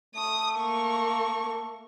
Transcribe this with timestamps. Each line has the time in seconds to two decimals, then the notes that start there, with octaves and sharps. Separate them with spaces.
0.15 A3 D#6
0.59 A#3 C#6